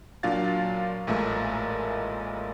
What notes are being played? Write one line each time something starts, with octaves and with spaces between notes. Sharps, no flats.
A#2 F#3 D4 F4 F5 A6
A1 A#2 G#3 A3 E5 A#5